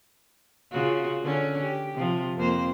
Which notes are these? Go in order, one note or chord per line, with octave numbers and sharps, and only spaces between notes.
C#3 F4 F#4
D3 C#4
G4
C3 F3
F2 A#3 C5